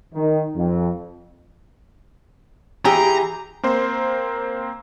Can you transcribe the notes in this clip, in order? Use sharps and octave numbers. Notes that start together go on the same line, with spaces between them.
D#3
F2
E3 G4 G#4 A#5
A#3 C4 C5